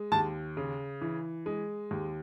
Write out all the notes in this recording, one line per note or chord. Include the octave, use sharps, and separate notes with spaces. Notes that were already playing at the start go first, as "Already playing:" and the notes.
Already playing: G#3
D#2 A5
C#3
E3
G#3
D#2